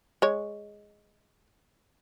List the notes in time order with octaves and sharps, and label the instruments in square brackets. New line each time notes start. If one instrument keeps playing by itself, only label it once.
[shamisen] G#3 C#5